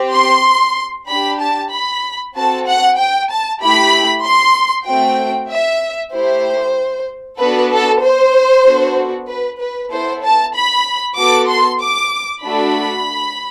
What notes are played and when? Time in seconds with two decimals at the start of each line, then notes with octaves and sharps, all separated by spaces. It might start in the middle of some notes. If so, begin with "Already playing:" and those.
Already playing: C4 G4
0.14 C6
1.08 D4 G4 B5
1.40 A5
1.72 B5
2.35 C4 F#4 A4 A5
2.67 F#5
2.98 G5
3.30 A5
3.60 A3 E4 G4 B5
4.24 C6
4.86 A3 C4 F#4 G5
5.50 E5
6.13 A3 E4 G4 C5
7.39 B3 D4 F#4 A4 B4
7.71 A4
8.02 C5
8.65 B3 D4 F#4 A4
9.28 B4
9.60 B4
9.91 B3 E4 A4 C5
10.22 A5
10.55 B5
11.17 B3 F#4 A4 D6
11.49 C6
11.81 D6
12.43 A3 D4 F#4 A4 B5